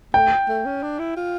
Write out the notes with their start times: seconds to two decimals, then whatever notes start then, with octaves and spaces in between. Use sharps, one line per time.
0.14 A3 G5
0.48 A3
0.65 C#4
0.83 D4
0.99 E4
1.16 F4